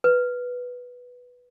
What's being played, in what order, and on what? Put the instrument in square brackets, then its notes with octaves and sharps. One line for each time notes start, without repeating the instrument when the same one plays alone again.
[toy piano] B4